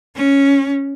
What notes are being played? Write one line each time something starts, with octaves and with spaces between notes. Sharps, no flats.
C#4